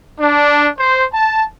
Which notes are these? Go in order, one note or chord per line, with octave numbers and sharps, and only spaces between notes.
D4
C5
A5